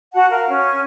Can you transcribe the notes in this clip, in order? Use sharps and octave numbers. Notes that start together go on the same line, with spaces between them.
F#4 F#5 A5
A#4 F5
C#4